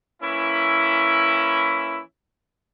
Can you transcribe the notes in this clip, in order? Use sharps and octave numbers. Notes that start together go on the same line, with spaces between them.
E3 A#3 C#4 E4